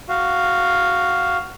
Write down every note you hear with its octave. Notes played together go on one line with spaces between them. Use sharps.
F#4 F5